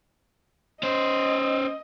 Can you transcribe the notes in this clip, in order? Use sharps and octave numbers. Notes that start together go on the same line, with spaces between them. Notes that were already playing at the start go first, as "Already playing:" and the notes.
C#4 C5 D#5